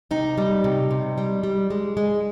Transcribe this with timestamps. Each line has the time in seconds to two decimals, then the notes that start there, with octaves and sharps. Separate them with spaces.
0.11 C3 D#4
0.38 G3
0.64 C3
0.91 C3
1.18 G3
1.43 G3
1.70 G#3
1.97 G#3